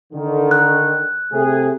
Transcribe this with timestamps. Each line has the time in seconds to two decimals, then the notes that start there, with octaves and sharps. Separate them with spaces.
0.13 D3 D#3
0.51 F#6
1.32 C3 A3 G#4